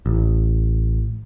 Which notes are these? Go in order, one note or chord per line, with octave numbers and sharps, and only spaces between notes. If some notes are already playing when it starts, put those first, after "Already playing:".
A1